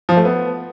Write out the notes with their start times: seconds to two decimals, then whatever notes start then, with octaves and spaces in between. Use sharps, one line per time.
0.09 F3
0.17 A3
0.25 B3